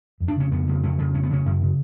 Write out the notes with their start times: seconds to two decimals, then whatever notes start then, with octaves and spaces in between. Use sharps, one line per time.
0.20 F2
0.28 D4
0.36 C#3 C#4
0.51 F2 B3
0.68 C#3
0.83 F2 C#4
0.98 C#3
1.14 F2 C#4
1.23 B3
1.30 C#3 C#4
1.46 F#2
1.61 C#3